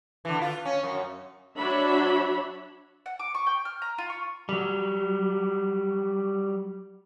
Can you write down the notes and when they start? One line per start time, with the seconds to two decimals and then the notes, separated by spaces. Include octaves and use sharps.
0.25 D3 E3
0.42 F4
0.65 C#4
0.83 F#2
1.56 F#3 D4 F#4 C#5 E5 B5
3.06 F#5
3.20 D6
3.35 C#6
3.46 G5
3.65 F6
3.82 A#5
3.98 F4
4.10 C#6
4.49 F#3 G3